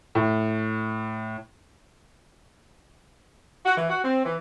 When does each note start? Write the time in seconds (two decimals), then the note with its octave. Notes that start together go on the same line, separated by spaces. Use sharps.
0.15 A2
3.66 F#4
3.77 E3
3.90 F#4
4.03 C4
4.25 E3